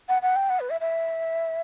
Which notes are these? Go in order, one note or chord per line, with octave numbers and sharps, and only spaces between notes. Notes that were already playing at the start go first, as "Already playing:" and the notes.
F#5
F#5
G5
F#5
B4
E5
E5